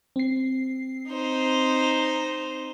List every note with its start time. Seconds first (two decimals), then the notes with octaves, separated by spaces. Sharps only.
0.16 C4 C7
1.10 D#4 C5